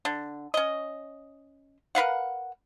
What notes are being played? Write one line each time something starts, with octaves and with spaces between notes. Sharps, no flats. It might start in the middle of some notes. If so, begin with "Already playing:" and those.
D3
C#4 D#5
A#4 B4 F5 F#5